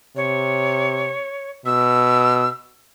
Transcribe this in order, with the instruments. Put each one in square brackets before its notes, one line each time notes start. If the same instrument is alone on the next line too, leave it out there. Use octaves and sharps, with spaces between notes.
[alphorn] C3 [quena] C#5
[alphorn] B2 [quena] E6